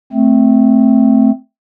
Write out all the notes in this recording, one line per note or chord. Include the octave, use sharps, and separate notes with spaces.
A3 C4